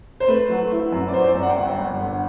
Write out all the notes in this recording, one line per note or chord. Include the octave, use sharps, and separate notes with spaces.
C5
A3 B4
F#3
E4
F#2
D5
F#3 C5
C5
D5
F#2
F#5
G5
G1 F#5
G1
D3